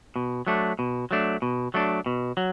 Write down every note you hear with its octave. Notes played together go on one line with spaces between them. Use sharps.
B2
F#3 A3 D4
B2
F#3 A3 D4
B2
F#3 A3 D4
B2
F#3